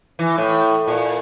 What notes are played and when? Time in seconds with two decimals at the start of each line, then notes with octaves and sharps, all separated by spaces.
0.19 E3
0.38 A2
0.88 A#2